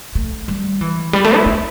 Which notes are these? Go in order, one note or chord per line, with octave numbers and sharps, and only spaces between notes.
A3
G3
E3
G3
A3
E4
E4